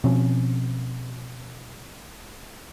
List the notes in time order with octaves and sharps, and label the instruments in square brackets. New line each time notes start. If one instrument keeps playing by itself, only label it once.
[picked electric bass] B2 F3 C4 C#4